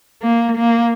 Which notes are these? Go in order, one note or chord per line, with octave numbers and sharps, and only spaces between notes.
A#3
A#3